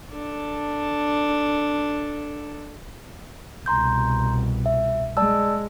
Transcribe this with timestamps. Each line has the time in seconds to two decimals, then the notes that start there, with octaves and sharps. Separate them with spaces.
0.12 D4 A4
3.66 C2 B2 A#5 C6 G6
4.66 E5
5.17 G#3 D5 A5 E6